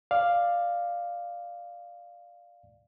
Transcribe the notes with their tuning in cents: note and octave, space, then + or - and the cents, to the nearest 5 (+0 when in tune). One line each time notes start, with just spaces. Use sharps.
D5 +10 F5 +0